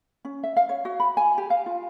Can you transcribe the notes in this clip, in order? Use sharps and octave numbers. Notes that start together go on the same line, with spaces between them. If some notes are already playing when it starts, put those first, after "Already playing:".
C#4
E5
F5
C#5
F#4
B5
G#5
G4
F5
F4